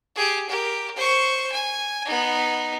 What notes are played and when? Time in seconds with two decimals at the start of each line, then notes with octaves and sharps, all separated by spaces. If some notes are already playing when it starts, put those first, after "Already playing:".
0.16 G4 G#4
0.49 G4 A#4
0.96 C5 C#6
1.52 G#5
2.05 B3 D#4